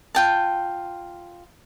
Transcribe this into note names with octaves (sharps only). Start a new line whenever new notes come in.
F4 G5 A5